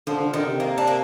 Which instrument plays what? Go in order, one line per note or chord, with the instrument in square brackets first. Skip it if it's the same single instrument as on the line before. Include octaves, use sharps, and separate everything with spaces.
[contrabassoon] D3 [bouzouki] F3
[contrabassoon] D3
[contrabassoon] D3 [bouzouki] D#3
[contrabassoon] C3
[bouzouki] A#3
D4
A#3